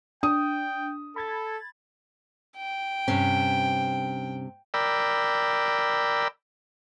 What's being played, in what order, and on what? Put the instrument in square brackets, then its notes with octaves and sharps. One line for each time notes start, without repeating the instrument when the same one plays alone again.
[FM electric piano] D4 [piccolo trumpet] G5 [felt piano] D#6
[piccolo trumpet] A4 [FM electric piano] B5 G#6 A6
[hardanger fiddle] G5
[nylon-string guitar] G2 C3 C#4
[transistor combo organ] A#4 D5 G5 B5 E6